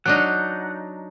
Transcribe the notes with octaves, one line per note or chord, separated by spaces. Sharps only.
F#3 D4 D#4 F#5